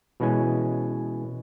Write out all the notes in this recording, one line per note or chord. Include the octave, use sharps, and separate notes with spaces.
B2 E3 G#3 C#4 G#5